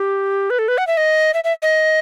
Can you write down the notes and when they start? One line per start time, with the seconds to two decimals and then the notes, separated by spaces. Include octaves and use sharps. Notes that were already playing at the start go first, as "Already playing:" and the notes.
Already playing: G4
0.50 B4
0.59 A4
0.68 B4
0.78 F#5
0.87 E5
0.97 D#5
1.34 E5
1.44 E5
1.62 D#5